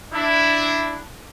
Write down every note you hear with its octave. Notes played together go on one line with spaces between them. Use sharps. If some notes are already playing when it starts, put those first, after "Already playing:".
D4 E4